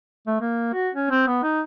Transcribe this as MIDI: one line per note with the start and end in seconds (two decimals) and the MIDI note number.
0.27 0.36 57
0.41 0.72 58
0.73 0.89 66
0.95 1.10 61
1.10 1.24 60
1.27 1.39 59
1.43 1.61 63